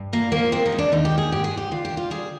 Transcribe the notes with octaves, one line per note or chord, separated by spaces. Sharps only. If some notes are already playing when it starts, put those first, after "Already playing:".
Already playing: G2
A#2 A#3
F3 A#3
G#3 C4
D#4
G#3
D4
D#2 D#4
G4
D#3
G#4
G#2 G4
G#4
G#2
G4
D2 F4
G4
D2
F4
G3 G#4